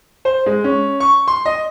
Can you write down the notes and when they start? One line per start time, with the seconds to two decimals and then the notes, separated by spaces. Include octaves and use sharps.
0.25 C5
0.46 G#3
0.64 C#4
1.00 C#6
1.28 C6
1.46 D#5